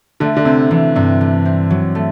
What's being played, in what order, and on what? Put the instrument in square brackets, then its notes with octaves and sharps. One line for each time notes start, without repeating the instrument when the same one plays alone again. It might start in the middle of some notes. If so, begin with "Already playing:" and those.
[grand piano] D3 [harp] A3
[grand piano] D3
[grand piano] C3 [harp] C4
[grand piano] C3 [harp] E3
[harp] G2 [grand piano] C3
[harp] A3
C4
F#3
A3